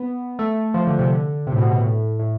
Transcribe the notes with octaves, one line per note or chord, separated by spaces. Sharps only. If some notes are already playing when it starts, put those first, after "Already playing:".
Already playing: B3
A3
F3
D3
C3
D3
C3
A2
B2
B2
A2
A2